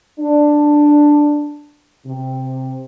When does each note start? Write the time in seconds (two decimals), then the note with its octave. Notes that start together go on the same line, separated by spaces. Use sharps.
0.19 D4
2.06 C3